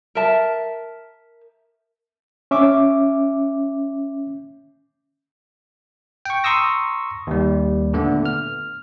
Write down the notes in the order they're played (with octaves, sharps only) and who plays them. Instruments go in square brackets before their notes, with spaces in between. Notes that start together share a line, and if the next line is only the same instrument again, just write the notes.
[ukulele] A#4 E5 A5
[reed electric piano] C#4 E5 D6
[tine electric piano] G5 C#6
A#5 C6 C#6 D#6 E6 A#6
D#2 G3
A#2 D3 A3 B3
F6